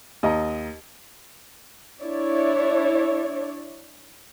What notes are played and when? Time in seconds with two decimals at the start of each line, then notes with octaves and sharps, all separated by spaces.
0.23 D#2 D#5 A#5
2.01 D4 E4 C#5 D5